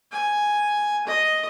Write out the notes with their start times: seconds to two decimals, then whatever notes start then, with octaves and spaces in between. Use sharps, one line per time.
0.12 G#5
1.07 D#5